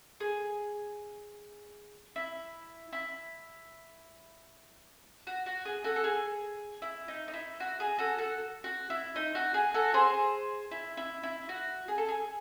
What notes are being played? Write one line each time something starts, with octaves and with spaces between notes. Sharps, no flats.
G#4
E4
E4
F#4
F#4
G#4
F#4 A4
A4
G#4
E4
D#4
D#4
E4
F#4
G#4
F#4 A4
F#4 A4
F#4
E4
D#4
F#4
G#4
F#4 A4
G#4 C5
E4
E4
E4
F#4
G#4
A4
G#4